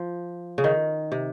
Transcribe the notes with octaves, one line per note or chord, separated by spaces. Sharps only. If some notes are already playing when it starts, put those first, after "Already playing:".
Already playing: F3
C#3
D#3
C3